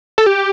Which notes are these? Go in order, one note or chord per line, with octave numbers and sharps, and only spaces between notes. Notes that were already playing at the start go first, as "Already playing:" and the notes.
A4
G4